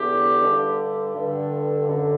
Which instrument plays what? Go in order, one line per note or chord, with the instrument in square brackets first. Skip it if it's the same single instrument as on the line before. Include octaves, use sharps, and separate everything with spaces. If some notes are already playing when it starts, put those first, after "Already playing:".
Already playing: [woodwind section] E2 D3 G4
G2 D3
G2 D3
F#2 D3